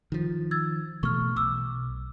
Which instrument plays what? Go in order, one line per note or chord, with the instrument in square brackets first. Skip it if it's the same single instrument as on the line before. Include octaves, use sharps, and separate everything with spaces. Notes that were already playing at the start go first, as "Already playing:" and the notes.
[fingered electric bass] D#3 F3
[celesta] E6 G#6 A6
[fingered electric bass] B2 E3 A3 [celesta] C#6 F6
[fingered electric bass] B1 [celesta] D6 E6